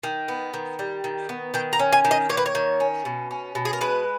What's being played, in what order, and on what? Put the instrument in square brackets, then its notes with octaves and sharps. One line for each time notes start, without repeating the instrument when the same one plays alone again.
[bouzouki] D#3
B3
D#3
G3
D#3
B3
D#3 G5
A#5
C#4
G#5
D#3
D#5
A#3 C#5
B4
C#5
D#3
C#4
B2
C#4
B2
G#4
A#4
G#3 B4